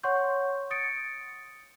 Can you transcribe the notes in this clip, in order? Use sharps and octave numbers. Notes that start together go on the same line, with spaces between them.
C#5 F#5 C6 C#6 G6
D#6 A6 C#7 D7